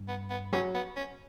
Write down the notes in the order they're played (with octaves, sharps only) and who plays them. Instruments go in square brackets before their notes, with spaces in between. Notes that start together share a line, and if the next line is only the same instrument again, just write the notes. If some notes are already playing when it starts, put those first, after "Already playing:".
Already playing: [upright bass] G2
[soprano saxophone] B3
B3
[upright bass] F#3 [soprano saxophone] C#4
[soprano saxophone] B3
C#4